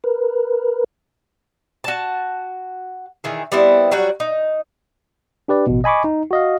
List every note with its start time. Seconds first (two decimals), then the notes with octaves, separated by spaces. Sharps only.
0.04 A#4 B4
1.84 F#4 A5
3.24 D#3 E3 G#4
3.52 G3 B3 C4 E4
3.91 F#3 G3 F#4 F#5
4.20 D#4
5.48 D4 G4 B4 D5
5.67 A1 B2
5.84 D#5 G#5 B5 C#6 D6
6.04 D#4
6.31 F#4 D#5 F5